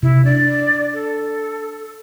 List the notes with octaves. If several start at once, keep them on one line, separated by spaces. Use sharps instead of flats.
C3 E4
D4 D5
A4